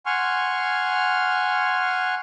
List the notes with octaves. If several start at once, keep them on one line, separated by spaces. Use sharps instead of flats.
F#5 G#5 C6 C#6 F6